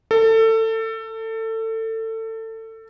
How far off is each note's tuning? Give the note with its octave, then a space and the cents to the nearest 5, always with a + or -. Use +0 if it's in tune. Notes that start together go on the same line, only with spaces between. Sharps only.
A4 +25